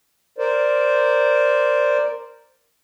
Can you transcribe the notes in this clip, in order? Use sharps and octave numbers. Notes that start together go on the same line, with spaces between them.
A#4 C5 D5